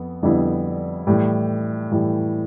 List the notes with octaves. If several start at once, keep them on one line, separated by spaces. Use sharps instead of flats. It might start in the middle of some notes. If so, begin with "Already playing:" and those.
Already playing: F2 B3
F2 D3 G3 B3 E4
A2 E3 G3
A2 E3 G3